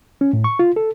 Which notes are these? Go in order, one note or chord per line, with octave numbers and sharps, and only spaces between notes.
C#4
A2
C#6
F4
A4